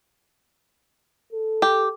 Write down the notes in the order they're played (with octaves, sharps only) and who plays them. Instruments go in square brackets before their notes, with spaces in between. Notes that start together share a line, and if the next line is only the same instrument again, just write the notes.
[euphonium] A4
[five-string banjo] G4